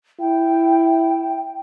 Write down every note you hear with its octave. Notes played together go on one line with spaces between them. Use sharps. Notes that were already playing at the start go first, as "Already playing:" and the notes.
E4 G5